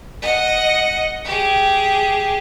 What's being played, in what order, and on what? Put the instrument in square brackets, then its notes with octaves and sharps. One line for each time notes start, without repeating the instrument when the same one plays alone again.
[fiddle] D#5 F#5
G4 G#4